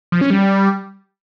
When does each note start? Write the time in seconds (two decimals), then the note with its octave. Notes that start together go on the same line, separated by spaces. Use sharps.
0.12 F3
0.21 C#4
0.30 G3